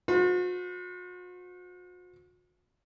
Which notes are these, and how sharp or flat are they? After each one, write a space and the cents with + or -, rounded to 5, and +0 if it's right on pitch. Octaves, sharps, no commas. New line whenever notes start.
F#4 -45 C5 -40